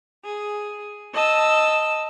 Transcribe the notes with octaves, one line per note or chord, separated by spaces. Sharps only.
G#4
D#5 A5 E6